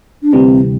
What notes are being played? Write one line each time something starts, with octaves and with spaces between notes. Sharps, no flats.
D4
D2 C3 E3 G3 C4